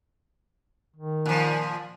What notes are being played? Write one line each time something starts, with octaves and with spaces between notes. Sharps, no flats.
D#3
A#2 F3